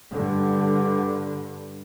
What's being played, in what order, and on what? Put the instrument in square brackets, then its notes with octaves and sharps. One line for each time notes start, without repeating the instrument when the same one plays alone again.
[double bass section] G2 D3